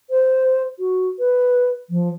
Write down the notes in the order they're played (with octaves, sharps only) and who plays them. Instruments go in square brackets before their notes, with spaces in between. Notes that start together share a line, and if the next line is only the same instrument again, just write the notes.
[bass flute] C5
F#4
B4
F3